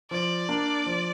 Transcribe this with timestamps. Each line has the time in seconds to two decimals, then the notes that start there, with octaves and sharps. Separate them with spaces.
0.11 F3 D5
0.48 A#3 D4
0.86 F3